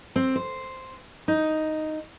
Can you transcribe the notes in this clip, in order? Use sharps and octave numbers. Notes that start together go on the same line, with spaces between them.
C4
C5
D#4